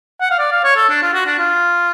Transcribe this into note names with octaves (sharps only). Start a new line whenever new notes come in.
F#5
F5
D5
F5
C#5
A4
D4
F4
F#4
D4
F4